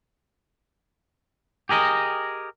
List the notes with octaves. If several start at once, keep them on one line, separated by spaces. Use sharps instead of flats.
G4 G#4 A#4 D#5